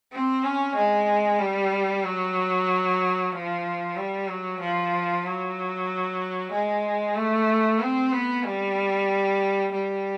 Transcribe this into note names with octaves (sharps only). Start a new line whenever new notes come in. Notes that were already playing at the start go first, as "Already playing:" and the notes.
C4
C#4
G#3
G3
F#3
F3
G3
F#3
F3
F#3
G#3
A3
C4
B3
G3
G3